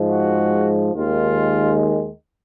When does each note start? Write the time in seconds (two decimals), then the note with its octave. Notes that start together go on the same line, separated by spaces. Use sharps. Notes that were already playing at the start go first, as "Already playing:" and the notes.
Already playing: G#2 F3 G#3
0.09 F#4
0.94 D#2 D#3 G#3 F4